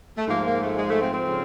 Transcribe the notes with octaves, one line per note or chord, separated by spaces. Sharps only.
A3
G#2 F3 A#3
A#3
A3
G#3
A3
C4
C4
C#3 F3